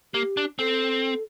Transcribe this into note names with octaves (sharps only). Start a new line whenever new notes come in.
A#3 G4
D4
C4 A4